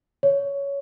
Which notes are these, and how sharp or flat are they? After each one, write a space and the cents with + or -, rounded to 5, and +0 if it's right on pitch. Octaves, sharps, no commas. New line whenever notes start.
C#5 +15